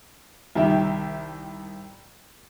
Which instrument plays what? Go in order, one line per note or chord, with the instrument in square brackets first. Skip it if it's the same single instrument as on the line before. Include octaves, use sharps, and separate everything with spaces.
[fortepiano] C2 D#3 G4 E5